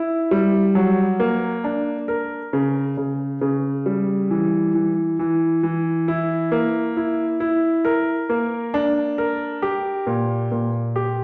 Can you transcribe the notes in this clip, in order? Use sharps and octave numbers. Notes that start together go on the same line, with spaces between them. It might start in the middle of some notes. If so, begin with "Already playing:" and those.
Already playing: E4
G3
F#3
A#3
D4
A#4
C#3
C#3
C#3
G3
E3
E3
E3
E3
E4
A#3
E4
E4
A#4
A#3
D4
A#4
G4
A#2
A#2
G4